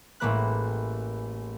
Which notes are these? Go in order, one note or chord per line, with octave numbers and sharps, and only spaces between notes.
A1 A2 G#3 A#3 B4 F#6